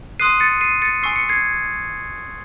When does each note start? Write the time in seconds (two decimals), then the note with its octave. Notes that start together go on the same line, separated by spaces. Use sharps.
0.20 C6 D#6 F#6 C7 D#7
0.40 A6 C#7
0.61 C7 D#7
0.82 A6 C#7
1.03 G#5 C#6 E6 C7
1.16 C#7
1.29 G#6 C7